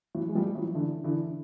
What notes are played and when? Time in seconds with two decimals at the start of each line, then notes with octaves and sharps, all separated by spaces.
0.15 E3 F#3
0.29 G#3
0.35 F3 G3
0.55 E3 F#3
0.75 D3 E3
1.04 D3 E3